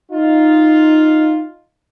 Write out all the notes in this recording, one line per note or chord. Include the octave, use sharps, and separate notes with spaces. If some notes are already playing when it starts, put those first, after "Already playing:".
D#4 F4